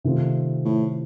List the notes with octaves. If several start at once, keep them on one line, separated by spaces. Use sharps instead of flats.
C3 D#3 A3 C4 F4
A2